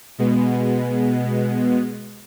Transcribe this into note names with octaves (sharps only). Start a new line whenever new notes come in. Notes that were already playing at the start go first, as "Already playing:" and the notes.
B2 G#3 B3